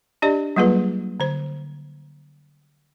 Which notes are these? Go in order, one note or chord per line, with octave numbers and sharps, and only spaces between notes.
D4 G4 D5 D#5
F#3 G3 A#3 F4 G#4 B4
D3 C5